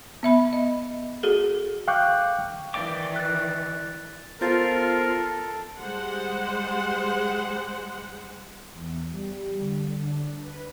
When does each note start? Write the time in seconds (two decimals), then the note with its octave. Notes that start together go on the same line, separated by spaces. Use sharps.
0.23 B3 E5 B5
0.53 D#5
1.23 F#4 G#4 A4
1.88 F5 G5 C#6 D6 F#6 G6
2.74 D#3 E3 D5 G5 D6
3.16 F#6 A6
4.41 B3 F4 A4 A#4 C5 A6
5.77 G3 G#3 C5 F#5
8.73 E2
9.10 G3
9.57 D3
9.97 D4
10.38 B4